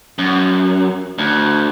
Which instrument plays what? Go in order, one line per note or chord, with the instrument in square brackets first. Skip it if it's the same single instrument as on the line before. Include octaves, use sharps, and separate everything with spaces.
[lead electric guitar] F#2
D2